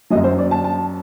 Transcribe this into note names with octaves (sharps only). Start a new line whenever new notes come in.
F#2 F#3 D#5
C5
D5
A5
A5